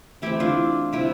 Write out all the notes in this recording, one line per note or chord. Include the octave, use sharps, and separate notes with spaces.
E3 A3 C4 E4 G4
D4 F4
C3 G3 C4 E4 G4